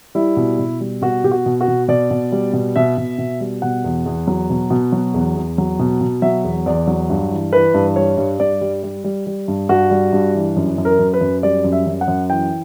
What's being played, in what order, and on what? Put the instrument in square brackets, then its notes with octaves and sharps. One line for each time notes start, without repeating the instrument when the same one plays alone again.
[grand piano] G3 E4
B2
B2
G3
B2 F#4
B2 G4
F#4
B2
F#4
B2
B2 D5
B2
G3
B2
B2 E5
B2
B2
G3
B2 F#5
E2
E2
F#3
B2
B2
F#3
E2
E2
F#3
B2
B2
F#3 E5
E2
E2 D5
F#3
G2
E3
E3 B4
G2
G3 C#5
G2
G2 D5
G3
G3
G3
G3
G2
G2 F#4
G3
G2
E3
F#2
F#2
A#4
F#2
B4
F#2
G3 D5
F#2
E5
F#2
F#5
F#2
E3 G5